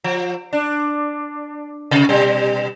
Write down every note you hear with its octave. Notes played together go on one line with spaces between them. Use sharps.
F3
D4
C3
B2 G3